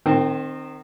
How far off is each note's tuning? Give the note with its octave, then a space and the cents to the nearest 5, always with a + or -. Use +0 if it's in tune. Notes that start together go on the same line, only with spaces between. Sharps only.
D#3 -25 C4 +5